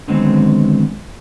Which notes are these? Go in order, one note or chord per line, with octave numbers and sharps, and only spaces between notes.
D3 D#3 F#3 G#3 B3 C4